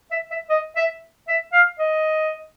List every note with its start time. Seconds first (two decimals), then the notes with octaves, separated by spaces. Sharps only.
0.11 E5
0.31 E5
0.50 D#5
0.76 E5
1.28 E5
1.53 F5
1.79 D#5